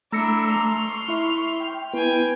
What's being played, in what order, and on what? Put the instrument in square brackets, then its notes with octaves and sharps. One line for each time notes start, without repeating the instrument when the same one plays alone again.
[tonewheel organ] A3 E6 [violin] D4 E4 [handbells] A#5 A#6 C#7
[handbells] A#5 [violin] C6 F6
[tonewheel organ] C#6
[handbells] E4 E5
[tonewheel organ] G5
[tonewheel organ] B3 E4 [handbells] B4 [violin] G5 G#5